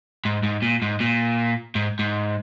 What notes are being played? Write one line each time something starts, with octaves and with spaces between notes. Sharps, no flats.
G#2
G#2
A#2
G#2
A#2
G#2
G#2